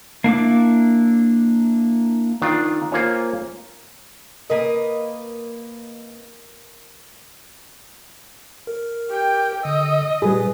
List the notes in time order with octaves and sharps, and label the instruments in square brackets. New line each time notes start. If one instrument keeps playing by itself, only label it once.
[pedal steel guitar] A#3 D4 E4 D6
[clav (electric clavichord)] D#3 D4 F4
A#3 F4 C5 C#5 G#5
[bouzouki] A#3 B4 D#5 [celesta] A#4
[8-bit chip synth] A#4
[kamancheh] G4 G5
[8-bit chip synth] D3 E6 [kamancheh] D#5
[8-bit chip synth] A#2 B4 [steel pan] G3 G#4